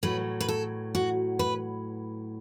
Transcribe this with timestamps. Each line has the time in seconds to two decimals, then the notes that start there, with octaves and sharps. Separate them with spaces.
0.03 A2 F#3 B4
0.40 B4
0.49 A4
0.95 F#4
1.39 B4